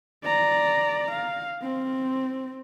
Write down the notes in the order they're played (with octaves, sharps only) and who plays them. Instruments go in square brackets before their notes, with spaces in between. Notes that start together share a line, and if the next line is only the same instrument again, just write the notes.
[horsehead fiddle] D5 A#5
F5
C4